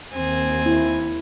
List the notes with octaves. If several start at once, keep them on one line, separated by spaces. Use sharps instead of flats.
D#2 C4 G#5
E4